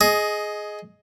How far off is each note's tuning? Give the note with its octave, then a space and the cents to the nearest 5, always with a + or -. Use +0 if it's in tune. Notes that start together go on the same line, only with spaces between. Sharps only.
G#4 +15 D#5 +0